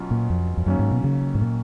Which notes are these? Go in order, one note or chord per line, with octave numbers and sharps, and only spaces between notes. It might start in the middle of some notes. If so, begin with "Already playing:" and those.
Already playing: B2 F#3 C#4 F4
A#2
F2
F2
F#2 D#3 F#3 A#3 C#4
G#2
B2
C#3
G#2
A#2